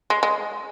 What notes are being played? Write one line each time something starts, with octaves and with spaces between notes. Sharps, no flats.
G#3
G#3